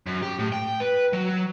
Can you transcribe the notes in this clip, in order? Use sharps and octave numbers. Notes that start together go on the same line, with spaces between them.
F#2
G4
A2
G5
B4
F#3